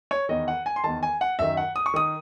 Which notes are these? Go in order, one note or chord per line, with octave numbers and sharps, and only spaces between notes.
C#5
E2 D#3 D#5
F#5
G#5
C6
E2 D#3 A5
G#5
F#5
F#2 D#3 E5
F#5
D#6
C#6
D#3 D#6